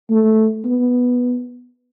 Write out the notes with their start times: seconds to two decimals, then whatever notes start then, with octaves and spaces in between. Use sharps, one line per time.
0.11 A3
0.65 B3